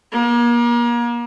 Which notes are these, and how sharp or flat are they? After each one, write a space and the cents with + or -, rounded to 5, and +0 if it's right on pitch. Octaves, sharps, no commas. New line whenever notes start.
A#3 +35